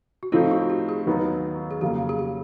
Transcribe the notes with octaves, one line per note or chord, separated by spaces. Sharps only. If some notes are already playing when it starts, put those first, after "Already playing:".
F#4
A2 F3 A3 C4 D#4 F4
F#4
G4
G#4
D#2 D#3 F#3 B3 D#4
G#4
F2 C#3 F#3 A#3 G4
G#4
G4